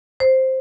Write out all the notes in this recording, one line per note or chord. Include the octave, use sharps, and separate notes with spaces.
C5